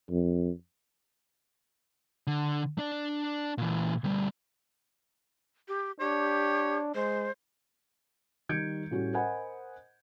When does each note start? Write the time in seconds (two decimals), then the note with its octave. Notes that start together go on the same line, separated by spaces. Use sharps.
0.11 F2
2.27 D3
2.79 D4 D5
3.58 A#2 E3
4.04 D2 G3
5.68 G4
6.00 D4 G4 C#5
6.95 G#3 C5
8.49 D#3 G3 G6 G#6 C#7 D7
8.91 A2 G3 C#4 F#4 G4
9.13 A#4 C5 D#5 F#5 G#5 B5